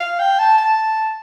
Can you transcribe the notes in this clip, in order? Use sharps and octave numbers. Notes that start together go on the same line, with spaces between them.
F5
G5
A5
A5